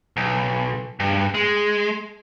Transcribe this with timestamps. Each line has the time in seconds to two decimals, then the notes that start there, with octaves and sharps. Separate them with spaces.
0.17 B1
1.00 G2
1.34 G#3